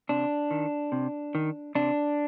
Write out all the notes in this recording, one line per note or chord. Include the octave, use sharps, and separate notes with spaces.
C3 D4
D#3
C3
D#3
C3 D4